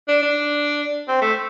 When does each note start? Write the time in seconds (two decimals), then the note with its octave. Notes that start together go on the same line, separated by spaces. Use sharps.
0.08 D4
0.23 D4
1.08 C4
1.22 A3